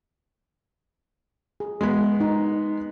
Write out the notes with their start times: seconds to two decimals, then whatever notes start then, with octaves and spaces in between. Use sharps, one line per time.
1.60 G#4
1.81 G#3 B3
2.20 D#4